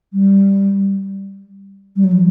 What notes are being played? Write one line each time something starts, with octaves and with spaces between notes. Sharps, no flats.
G3
G3
F#3
F3